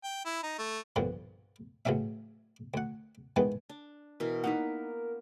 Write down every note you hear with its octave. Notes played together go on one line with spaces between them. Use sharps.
G5
E4
D#4
A3
B1 G2 A#2 D3 F3
A1 C#3 F#3 C#4 E5
D2 F#5
D#3 E3 G#3 B3
D4
B2 E3 A#4
A#3 B3 D#4 B4 F#5